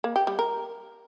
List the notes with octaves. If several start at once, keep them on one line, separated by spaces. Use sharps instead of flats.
A#3
G4
G3
A#4